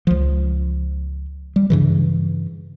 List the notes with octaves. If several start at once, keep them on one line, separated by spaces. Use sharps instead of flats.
C#2 F3
G3
G2 C#3 E3